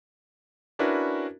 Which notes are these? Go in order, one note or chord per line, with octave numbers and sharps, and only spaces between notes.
C#4 D4 E4 F#4 A#4 B4